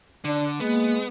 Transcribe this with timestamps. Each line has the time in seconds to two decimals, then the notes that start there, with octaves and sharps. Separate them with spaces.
0.25 D3 D4
0.60 G#3 A#3 B3